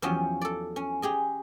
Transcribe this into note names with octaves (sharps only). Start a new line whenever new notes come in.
E2 F3 F#3 C#4 G4
A4 D5
C#4
G4 G#4 D#5